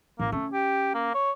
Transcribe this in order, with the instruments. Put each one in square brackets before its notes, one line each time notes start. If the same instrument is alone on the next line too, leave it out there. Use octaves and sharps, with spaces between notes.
[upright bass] A1 [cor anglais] A#3
[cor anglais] A3 [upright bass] C#4
[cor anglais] G4
A#3
C#5